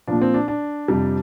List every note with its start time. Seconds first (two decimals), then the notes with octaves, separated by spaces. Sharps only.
0.07 A#2 F3 D4
0.21 C4
0.34 D4
0.48 D4
0.88 F2 C3 G3